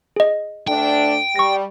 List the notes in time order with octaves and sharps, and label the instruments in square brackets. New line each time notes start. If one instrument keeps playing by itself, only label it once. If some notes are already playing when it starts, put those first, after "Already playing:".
[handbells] G#4 D#5
[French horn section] D2 A3 D4 [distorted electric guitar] G5
[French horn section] G3 [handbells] C#6 A#6